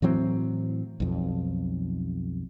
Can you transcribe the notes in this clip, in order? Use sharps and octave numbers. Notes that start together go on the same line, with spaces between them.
A2 E3 F#3 C4
B1 F2